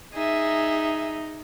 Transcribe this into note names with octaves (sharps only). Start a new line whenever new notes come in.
D#4 G#4 E5